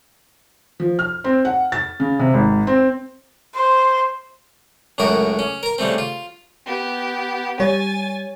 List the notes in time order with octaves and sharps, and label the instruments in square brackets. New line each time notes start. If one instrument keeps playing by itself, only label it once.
[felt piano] F3
F6
C4
F#5
A6
C#3
C3
G#1
C4
[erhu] C5
[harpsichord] C#2 F#2 A2 F#4 A#4 B5
C#4
A#4 A#5
C#3 G3 A3 C4
F4
[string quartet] B3 G4
[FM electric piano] G3 C#5 [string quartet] G#5 A6